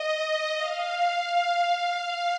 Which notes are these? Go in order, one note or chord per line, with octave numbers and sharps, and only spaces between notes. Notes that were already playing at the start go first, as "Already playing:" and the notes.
Already playing: D#5
F5